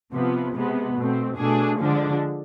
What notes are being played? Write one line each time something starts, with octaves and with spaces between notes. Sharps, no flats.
C3 F3 B3
C3 G#3 B3
B2 A3 C4
B2 A3 D4 G#4
D3 F3 G#3 D4